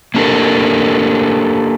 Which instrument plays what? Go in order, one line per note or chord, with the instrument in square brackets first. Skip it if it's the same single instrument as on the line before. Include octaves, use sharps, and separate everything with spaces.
[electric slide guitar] A#3 D4 G4 A4 A#4